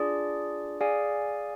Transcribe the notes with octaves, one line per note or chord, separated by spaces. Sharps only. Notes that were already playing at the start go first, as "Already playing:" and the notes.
Already playing: D4 F4 G#4 D5
G#4 D5 F5 G#5